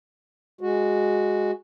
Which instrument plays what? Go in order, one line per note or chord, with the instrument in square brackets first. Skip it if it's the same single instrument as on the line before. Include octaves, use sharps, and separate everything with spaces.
[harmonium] G#3 F#4